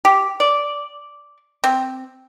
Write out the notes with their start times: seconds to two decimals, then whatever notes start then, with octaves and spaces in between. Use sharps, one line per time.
0.05 G4
0.40 D5
1.64 C4